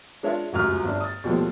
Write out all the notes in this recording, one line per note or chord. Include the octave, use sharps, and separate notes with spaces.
G#3 D4 F4 C#5 E5 F5
F1 C#2 F#2 F6
G1 D4
D#6 A6
D#2 B2 F3 G3 A3